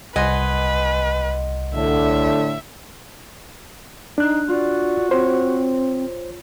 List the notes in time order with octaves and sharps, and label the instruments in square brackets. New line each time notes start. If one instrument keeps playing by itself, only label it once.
[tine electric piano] C2 F#5 C6 [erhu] B4 [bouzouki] D#5 G#5
[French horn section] A2 D3 [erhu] E5
[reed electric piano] D4 F#6 [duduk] D#4
[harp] F4 [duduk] F#4 [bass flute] D5
[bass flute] C4 [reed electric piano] C5 [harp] C#5